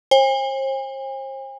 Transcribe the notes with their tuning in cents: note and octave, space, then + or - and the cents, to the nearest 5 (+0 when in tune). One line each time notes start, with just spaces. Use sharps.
C5 +40 G#5 -45